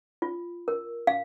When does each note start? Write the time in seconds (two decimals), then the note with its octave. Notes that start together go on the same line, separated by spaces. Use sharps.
0.22 F4
0.68 A#4
1.07 F5